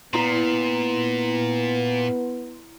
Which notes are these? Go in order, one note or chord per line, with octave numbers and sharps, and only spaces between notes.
A#2 B3 E4 A#5 C6